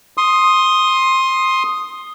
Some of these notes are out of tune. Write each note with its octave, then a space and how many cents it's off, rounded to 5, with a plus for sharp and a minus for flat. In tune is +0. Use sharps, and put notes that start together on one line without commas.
C6 +15 D#6 +0